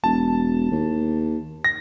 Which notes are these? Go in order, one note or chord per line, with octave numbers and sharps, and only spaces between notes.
E1 A5
D#2
A#6